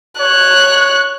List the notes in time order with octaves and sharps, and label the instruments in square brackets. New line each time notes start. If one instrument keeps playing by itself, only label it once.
[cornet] C#5 [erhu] F#6